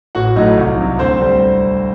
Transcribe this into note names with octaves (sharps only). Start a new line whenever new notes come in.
A1 F#4 F#5
A2 F#3 A3 D#4 D#5
C2
C3 F#3
D2 C4 C5
D3 G3 C4